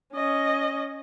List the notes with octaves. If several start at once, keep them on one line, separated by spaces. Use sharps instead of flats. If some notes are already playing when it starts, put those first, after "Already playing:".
C#4 D#5